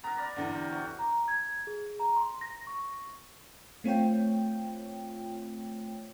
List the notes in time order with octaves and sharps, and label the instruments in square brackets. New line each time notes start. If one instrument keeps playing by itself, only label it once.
[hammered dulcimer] B3 A#4 [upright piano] A#5
[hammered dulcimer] A#4 D5 B5
[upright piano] E2 D3
[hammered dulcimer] G4
C3 F#4
[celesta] A#5
G#6
G#4
A#5
C6
A#6
C#6
[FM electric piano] A3 C4 F4 C#5 G5